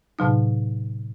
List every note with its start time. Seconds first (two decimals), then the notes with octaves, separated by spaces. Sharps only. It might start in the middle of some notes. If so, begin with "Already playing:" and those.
0.19 A2 C3 F#3 D#4